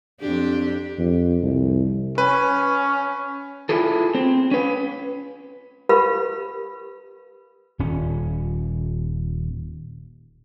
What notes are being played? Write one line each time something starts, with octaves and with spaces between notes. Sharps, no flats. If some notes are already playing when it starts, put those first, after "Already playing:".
F2 D4 G4
F2
C2
C#4 B4
E4 F4 G#4 A4
C4
C#4 B4
G4 A#4 B4 F5 B5
D#1 C#4